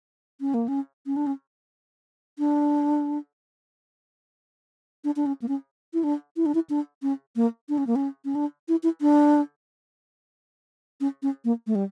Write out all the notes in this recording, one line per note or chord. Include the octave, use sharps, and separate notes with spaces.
C#4
A#3
C#4
C#4
D4
C#4
D4
D4
D4
C#4
A#3
C#4
E4
D4
E4
D4
E4
D4
C#4
A#3
D4
C#4
A#3
C#4
C#4
D4
E4
E4
D4
C#4
C#4
A#3
A3
G3